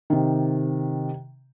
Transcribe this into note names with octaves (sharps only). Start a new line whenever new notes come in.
C3 D#3